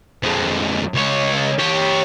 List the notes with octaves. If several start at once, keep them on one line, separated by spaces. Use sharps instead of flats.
F2 G#3
C#2 C#5
G4 C#5